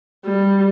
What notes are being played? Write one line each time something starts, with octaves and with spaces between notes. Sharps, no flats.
G3